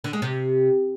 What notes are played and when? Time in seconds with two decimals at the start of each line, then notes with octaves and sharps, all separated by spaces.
0.04 D3
0.13 G#3
0.22 C3